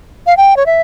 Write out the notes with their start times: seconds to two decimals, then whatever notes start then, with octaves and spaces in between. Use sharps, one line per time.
0.26 F5
0.37 G5
0.57 C#5
0.66 E5